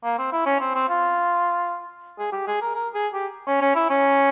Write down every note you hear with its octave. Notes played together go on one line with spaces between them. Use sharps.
A#3
C4
E4
C#4
C4
C4
F4
G#4
G4
G#4
A#4
A#4
G#4
G4
C#4
C#4
E4
C#4